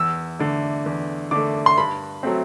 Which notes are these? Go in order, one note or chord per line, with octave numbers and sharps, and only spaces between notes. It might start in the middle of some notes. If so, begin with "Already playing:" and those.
Already playing: E2 E6
D3 A3
E2
D3 A3 D6
C6
G2 B5
F#3 A3 C4